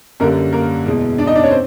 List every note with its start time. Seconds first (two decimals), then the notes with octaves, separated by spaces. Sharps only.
0.20 F#2 D3 G3 A#3 A#4
0.53 A#3 A#4
0.86 E2 B2 G#3
1.18 D4 D5
1.26 D#4 D#5
1.35 D4 D5
1.43 C#4 C#5
1.51 C4 C5